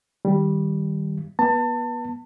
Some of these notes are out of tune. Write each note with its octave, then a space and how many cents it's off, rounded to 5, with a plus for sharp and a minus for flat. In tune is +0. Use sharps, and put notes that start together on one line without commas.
D#3 +0 G3 +0
B3 -30 A5 +30